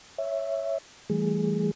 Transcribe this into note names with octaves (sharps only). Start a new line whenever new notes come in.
C#5 E5
E3 G3 A3 G#4